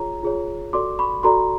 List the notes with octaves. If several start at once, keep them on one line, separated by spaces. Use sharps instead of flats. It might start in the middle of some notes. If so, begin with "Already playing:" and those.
Already playing: F4 G#4 C#5 A#5
F4 G#4 C#5
F#4 A4 D5 C6 D6
B5 C#6
F#4 A4 D5 A#5 C6